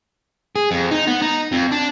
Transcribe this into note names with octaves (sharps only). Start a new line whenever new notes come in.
G#4
F2
D#4
B3
D#4
F2
D4